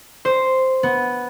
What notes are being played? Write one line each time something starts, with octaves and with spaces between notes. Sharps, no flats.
C5
B3